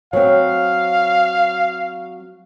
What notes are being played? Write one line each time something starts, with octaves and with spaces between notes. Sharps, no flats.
F#3 C4 F5